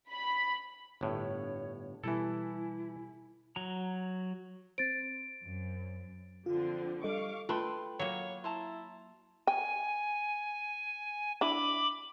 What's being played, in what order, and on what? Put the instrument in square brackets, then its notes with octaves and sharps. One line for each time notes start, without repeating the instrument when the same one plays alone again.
[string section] B5
[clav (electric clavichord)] G1 A2 [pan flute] C#5
[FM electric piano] B2 G3 G#5 [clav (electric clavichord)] E3 A4 [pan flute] E4
[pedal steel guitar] F#3 A#5
[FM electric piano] C4 C5 [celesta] A6 D7
[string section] F#2
[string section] D3 F3 C4 [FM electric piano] F4
[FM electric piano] G3 A4 D#5 [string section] F5 C#6 D6
[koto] A3 [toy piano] F4 [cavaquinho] B4 G5 C6
[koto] F#3 A#3 [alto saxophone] C#5
[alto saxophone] E4 [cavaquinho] A5 A#5 C6
[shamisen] G5 [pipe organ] G#5
[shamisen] D4 E4 [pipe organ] B5 D6